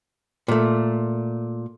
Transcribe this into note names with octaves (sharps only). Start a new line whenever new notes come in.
A#2 A3